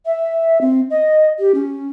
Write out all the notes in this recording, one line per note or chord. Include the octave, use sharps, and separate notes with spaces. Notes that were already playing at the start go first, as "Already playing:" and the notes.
E5
C4
D#5
G4
C#4